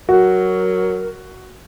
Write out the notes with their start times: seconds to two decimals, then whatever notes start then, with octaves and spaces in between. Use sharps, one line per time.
0.09 F#3 F#4 A#4